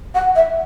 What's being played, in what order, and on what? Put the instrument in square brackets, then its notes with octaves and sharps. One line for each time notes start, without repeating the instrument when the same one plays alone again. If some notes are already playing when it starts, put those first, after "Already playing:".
[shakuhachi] F#5
E5